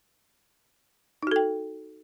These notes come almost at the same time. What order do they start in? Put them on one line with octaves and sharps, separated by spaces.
D#4 F#4 A4 G5